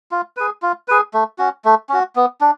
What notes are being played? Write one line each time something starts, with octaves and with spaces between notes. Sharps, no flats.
F4
G#4 B4
F4
G#4 B4
A3
C#4 F#4
A3
C#4 F#4
B3
D4